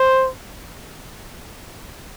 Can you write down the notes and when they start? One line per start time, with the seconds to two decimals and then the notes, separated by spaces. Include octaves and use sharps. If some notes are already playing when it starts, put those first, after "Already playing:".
Already playing: C5